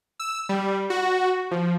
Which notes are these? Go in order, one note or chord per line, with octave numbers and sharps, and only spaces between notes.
E6
G3
F#4
F3